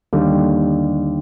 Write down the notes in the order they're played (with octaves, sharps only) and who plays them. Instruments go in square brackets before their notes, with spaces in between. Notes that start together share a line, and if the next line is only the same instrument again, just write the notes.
[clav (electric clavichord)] D#2 D3 G3